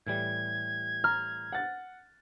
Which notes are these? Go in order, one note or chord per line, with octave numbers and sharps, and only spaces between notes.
A2 E3 G3 G#6
A#5 F6
F#5 A6